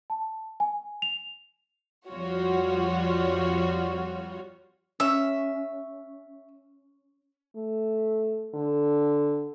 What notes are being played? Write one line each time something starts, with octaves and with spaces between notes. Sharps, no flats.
A5
G#5
F7
F2 F3 G3 F4 F#4 C#5
C#4 E5
A3
D3